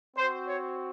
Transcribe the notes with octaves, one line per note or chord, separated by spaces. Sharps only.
C4 F#4 C5
C#5